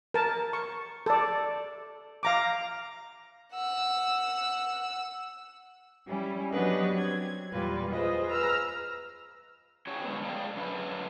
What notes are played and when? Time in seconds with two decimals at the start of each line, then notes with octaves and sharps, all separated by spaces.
0.14 A#4 A5
0.53 C#6
1.06 A4 D5
2.23 F5 A#5 D6
3.53 F#5 E6
6.06 G3 C#4 E4
6.51 F#3 B3 D4 G4 B4 D#5
6.93 C4 G#6
7.53 E2 A#2 G3 F4 B4
7.91 F4 G#4 B4 C5 D#5
8.27 B4 A#5 E6 F6
9.87 C#4 F#4 G#4 C#5 G5
10.04 D3 F#3 G#3 B3
10.24 G#4 A#4 D5 F5 G5
10.56 F#2 D3 C#4 F#4 B4